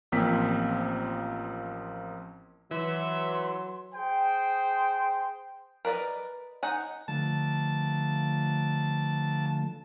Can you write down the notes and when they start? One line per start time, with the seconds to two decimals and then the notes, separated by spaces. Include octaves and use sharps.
0.12 A1 F3 A#3 C4 G5 B6
2.71 E3 F#3 E5 C6
3.94 G#4 C5 G5
5.85 A#4 B4 D5 D#5
6.63 D#4 F#5 G#5
7.08 D3 F3 A3 A5